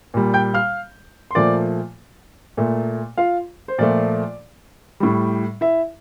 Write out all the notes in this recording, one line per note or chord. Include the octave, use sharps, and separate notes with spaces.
A#2 G3
G5 G6
F5 F6
C6
A#2 F3 A3 D5 D6
A#2 A3
F4 F5
C5
A#2 F3 A3 D5
A2 G3
E4 E5